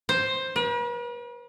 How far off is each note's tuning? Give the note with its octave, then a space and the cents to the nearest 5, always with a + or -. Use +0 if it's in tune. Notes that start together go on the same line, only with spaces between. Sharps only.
C5 +10
B4 -45